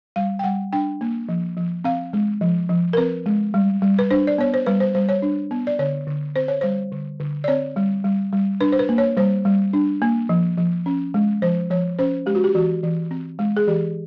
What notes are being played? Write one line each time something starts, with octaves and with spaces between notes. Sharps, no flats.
G3 F5
G5
G3 F#5
D4 G5
A#3
F3
F3
C4 F5
G#3
F3
F3
A#4
C4 B4
G#3
G3
G3
B4
D4 C5
D5
B3 C#5
C5
G3 B4
C5
G3 C5
C#5
D4
B3
D5
D3 C#5
D3
C4 C5
C#5
G3 C5
D3
D3
D5
C4 C#5
G3
G3
G3
D4 B4
C5
B4
A#3
C#5
G3 C5
G3
D4
A#3
F3
F3
C#4
G#3
F3 C5
F3 C#5
C#4 C5
G#3 G4
F#4
G4
E3 F#4
E3
C4
G#3
G#4
E3 G4